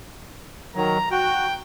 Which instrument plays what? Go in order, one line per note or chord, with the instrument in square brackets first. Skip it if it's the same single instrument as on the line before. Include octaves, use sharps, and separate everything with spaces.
[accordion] D#3 F#3 [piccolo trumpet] A#5
[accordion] F#4 [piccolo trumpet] G5